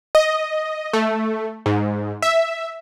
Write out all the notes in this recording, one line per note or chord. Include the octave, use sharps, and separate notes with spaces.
D#5
A3
G#2
E5